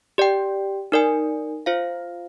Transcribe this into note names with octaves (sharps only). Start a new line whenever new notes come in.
G4 D5 G5
D#4 A#4 D5 G#5
F4 C5 F5